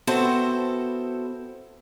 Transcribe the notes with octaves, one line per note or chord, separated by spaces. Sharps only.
B3 C4 E4 F#4 A4 C5